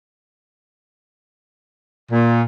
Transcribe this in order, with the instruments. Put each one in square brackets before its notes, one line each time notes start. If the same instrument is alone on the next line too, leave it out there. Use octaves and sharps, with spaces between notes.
[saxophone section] A#2